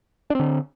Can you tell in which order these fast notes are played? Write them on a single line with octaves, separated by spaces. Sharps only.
D4 C4 D3